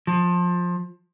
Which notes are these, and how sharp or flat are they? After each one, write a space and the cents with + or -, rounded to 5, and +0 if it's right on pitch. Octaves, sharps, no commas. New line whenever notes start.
F3 +20